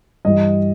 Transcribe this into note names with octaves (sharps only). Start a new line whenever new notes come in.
G2 E3 G3 D#5